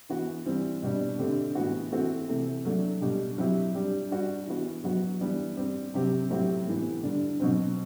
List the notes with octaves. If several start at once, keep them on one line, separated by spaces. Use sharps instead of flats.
E3 B3 F#4
E3 G3 C4
B2 G3 B3 D4
D3 A3 C4 G4
A2 E3 B3 F#4
E3 A3 C4 F#4
C3 E3 A3
F#3 A3 D4
B2 G3 D4 G4
F#3 C4 E4 G4
G3 D4 G4
G3 D4 F#4
E3 B3 F#4
F#3 B3 F#4
E3 G3 B3 D4
G3 C4 G4
C3 F#3 C4 G4
A2 F#3 C4 E4 G4
A2 E3 B3
D3 G3 D4
B2 F#3 C4